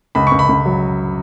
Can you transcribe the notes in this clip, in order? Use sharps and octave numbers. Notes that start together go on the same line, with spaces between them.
C#2 B5
C#6
C#2
B5
C#2
F#3